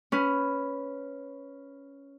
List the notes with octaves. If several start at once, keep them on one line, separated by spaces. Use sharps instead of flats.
C#4 B4